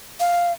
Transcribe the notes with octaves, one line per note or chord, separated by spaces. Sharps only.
F5